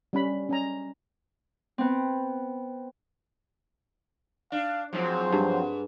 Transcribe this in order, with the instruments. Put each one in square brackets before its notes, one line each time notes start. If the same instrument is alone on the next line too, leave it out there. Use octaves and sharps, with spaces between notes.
[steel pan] G3 C#4 B5
C#4 G#5 A#5
[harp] B3 C4
[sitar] D4 [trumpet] F5
[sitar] G#2 [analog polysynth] F3 F#3 C4 [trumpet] C5
[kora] G2